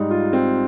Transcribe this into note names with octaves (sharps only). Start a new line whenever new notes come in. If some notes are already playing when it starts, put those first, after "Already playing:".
Already playing: G#2 G3 D#4
F4
C4